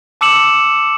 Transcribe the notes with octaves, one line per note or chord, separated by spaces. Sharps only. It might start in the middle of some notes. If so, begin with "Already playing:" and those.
A5 D6 E6 C#7 E7 F#7